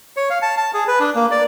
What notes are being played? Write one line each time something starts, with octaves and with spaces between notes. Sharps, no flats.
C#5
F5
A5
A5
G#4
B4
D4
A#3
D5